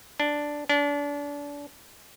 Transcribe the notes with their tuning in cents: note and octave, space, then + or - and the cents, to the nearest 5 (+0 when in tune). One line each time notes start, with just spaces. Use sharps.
D4 +0
D4 -30